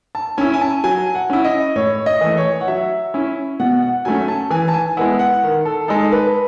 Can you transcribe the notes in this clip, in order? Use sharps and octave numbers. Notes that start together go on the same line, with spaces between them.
A5
C#4 E4 G#5
G#5
A5
F#3 G#5
F#5
C#4 E4
D#5
A2 C#5
D#5
E3 A3
C#5
F#5
F#3 E5
C#4 E4
B2 F#5
F#5
F#3 A3 C#4 G#5
A5
E3 G#5
A5
G#5
G#3 B3 E4 F#5
F#5
D#3
A4
G#3 D#4 A4
B4